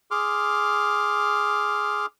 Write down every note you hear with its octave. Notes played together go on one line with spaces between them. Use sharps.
G#4 C6 D6 F6